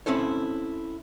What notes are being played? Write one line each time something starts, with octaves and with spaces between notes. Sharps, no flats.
C4 C#4 E4 A4 C#5